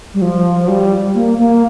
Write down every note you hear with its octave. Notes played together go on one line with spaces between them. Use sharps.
G3
F3
G3
A#3
A#3